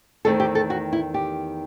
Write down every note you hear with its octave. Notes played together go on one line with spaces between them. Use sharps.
E2 D#3 A3 C4 A4
G4
A4
F#4
E4
G4